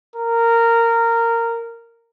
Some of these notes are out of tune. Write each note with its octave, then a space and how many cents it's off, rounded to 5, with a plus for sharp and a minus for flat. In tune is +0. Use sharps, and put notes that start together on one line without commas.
A#4 -15